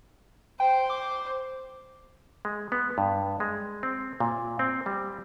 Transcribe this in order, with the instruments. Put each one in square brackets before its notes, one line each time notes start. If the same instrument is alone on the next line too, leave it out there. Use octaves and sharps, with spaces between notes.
[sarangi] C5 [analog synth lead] G5
[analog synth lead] D6
[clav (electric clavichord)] G#3
B3
G2
G#3
C4
A#2
C4
G3